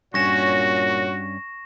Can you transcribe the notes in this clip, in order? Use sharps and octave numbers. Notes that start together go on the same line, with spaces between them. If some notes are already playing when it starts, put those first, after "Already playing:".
G2 A#2 C#4 F#4 C#5 C#6 A#6 E7